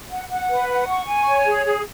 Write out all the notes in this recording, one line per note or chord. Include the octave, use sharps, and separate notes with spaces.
F#5
F#5
B4
F#5
C#6
G#5
C#5
G#4
G#4